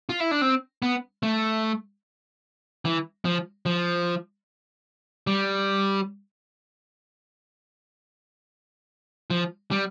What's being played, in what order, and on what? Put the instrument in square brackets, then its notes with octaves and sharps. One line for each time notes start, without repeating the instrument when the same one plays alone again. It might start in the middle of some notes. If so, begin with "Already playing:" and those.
[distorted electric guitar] F4
E4
D4
C4
B3
A3
E3
F3
F3
G3
F3
G3